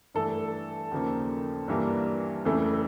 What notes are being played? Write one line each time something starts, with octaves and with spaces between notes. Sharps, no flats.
G2 E3 A3 A4
D#2 C#3 F3 A#3
G2 E3 G3 A#3
F2 C#3 E3 A3